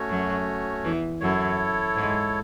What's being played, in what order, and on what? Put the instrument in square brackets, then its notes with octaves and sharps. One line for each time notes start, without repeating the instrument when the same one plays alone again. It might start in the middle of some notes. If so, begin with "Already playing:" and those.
Already playing: [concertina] A3 C#4 F#4 C#5
[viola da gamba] F#2 F#3
E2 E3
[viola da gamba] F#2 F#3 [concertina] E4 A4 C#5
[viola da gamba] G#2 G#3